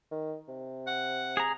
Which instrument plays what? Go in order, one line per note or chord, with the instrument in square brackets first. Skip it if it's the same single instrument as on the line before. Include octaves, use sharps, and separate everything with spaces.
[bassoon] D#3
C3
[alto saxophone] F#5
[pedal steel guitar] G#4 A#5